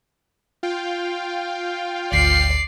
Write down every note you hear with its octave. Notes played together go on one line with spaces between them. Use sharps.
F4 F5 G5
G#1 D2 D5 C7